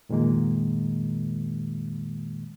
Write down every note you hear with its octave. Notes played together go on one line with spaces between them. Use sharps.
F2 A#2 D#3 G#3 A#3